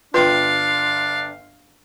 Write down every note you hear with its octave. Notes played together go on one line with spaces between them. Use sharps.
G1 D4 F4 B4 F5 G5 C6